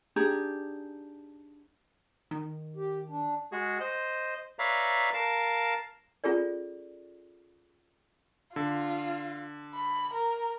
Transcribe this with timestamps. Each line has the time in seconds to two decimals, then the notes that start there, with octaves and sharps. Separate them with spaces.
0.16 D4 D#4 G4 G#4
2.31 D#3
2.76 G4
3.09 D4
3.52 G#3 F#4 G#4
3.80 C5 D#5
4.59 B4 C#5 D5 E5 F5 A#5
5.14 A#4 F5 A5
6.24 C#4 F4 G#4 A4 D5
8.56 D3 F4
9.74 B5
10.13 A#4